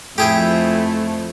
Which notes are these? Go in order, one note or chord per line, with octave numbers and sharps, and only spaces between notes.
F2 F3 A3 E4 G4 G#4 G5